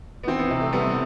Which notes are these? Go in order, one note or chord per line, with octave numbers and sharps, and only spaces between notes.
B3
E3 C4
B3
C3
A3
G3 B3
C4
B3